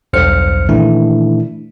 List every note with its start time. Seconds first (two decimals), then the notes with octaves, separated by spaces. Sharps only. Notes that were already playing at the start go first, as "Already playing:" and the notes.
0.13 B1 E2 G2 C5 F6 C#7
0.69 A#2 D#3 E3 A3 D4 E4